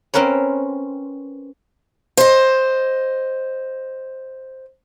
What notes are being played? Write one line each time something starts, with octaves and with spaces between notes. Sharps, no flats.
C4 C#4 A#4 B4 C#5
C5 D#5